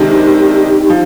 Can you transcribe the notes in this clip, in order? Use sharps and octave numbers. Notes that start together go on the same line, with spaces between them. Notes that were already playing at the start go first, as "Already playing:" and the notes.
Already playing: C3 D#3 G#3 D4 D#4 G4
F3